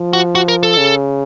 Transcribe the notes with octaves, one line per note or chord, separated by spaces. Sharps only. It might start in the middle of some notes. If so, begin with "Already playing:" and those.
Already playing: F3
F#4
F#4
A#4
A4
C#3